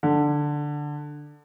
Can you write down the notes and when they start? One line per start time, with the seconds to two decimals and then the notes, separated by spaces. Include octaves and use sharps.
0.03 D3